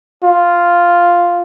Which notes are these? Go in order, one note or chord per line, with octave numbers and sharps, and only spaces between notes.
F4